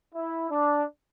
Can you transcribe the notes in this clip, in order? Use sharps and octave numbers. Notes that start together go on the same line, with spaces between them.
E4
D4